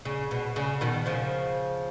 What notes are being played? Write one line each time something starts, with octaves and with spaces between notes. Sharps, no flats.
C#3
B2
C#3
B2 D#3
C#3 F3